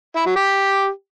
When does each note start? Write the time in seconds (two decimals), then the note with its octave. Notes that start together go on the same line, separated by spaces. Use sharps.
0.16 E4
0.26 F#3
0.36 G4